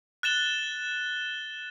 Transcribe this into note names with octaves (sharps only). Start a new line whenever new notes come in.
F#6 A6 E7 G7